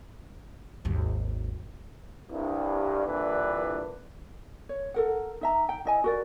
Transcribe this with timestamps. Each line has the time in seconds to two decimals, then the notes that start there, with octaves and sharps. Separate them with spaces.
0.85 G#1 D#2
2.31 C2 G2
3.06 C2 A#2 D3 E3 D4 B4
4.69 C#5
4.94 A4 A#4 F#5
5.41 D#4 E5 A#5
5.69 G5
5.85 E4 D#5 G#5
6.04 F#4 A#4 D5